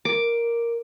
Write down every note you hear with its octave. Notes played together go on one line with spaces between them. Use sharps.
A#4 D6